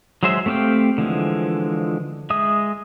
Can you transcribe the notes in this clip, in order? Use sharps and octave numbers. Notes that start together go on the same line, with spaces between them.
F#3 G#3 G#4 C5 E5
A3 C4 G4 F5 G5
D3 E3 F3 G#3
G#3 E5 D#6